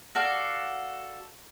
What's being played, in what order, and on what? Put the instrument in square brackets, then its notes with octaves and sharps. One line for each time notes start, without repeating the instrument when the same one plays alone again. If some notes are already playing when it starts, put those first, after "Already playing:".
[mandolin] F#4 A4 D5 F5